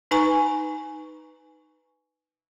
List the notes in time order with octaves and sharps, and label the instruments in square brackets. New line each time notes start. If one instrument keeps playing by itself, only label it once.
[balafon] D#4 B4 G#5 A#5 C#6